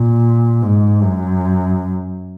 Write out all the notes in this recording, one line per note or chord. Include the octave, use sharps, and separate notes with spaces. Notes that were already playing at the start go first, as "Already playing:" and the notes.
Already playing: A#2
G#2
F#2